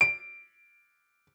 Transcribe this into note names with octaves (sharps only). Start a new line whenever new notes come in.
D7